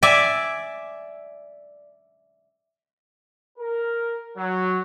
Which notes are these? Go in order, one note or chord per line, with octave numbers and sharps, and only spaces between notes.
D5 E5 G#5
A#4
F#3